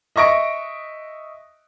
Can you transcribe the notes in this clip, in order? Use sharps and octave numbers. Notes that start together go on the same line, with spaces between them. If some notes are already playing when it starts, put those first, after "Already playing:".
D#5 E5 C#6 A#6 D7